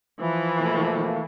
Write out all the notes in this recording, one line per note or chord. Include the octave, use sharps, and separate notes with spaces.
E3 F3
B2 A3 A#3